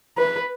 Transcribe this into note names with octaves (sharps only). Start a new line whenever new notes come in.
B4